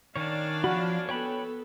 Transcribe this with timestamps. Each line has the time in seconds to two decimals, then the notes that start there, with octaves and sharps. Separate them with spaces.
0.16 D#3 C#4 D4 C#5 D5 F5
0.64 F3 F#4 B5
1.09 B3 A4 C#5 G5 B5